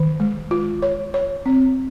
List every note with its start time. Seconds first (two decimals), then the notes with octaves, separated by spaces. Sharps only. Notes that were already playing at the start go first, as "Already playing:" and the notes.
Already playing: D#3
0.20 G#3
0.51 F4
0.82 C#5
1.14 C#5
1.46 C4